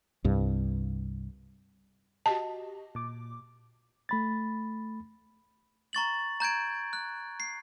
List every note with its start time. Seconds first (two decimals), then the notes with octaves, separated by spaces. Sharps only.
0.24 C2 G2
2.26 F#4 G4 D#5 A5
2.95 A#2 D6
4.09 A3 B5 A6
5.93 A#5 C#6 A6 F#7
6.40 A#5 G6 G#6 D7
6.93 F#6
7.40 C7